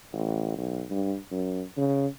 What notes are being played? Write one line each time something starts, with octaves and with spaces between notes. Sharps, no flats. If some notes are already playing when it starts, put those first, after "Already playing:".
A1
B1
G2
F#2
C#3